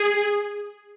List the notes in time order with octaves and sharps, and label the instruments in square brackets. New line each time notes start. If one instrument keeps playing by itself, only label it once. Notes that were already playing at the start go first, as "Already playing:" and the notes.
Already playing: [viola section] G#4